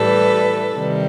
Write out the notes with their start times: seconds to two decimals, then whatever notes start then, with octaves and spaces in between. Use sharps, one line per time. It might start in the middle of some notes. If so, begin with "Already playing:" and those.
Already playing: A2 E3 G3 A4 B4
0.74 C3 D#3 G3